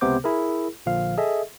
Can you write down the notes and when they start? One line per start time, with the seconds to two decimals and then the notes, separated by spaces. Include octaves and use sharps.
0.01 C#2 C3 B3 C5 D6 G6
0.24 E4 G#4 A#4
0.86 A#1 A#2 D3 F3 F5 F6
1.18 G#4 A4 D#5 E5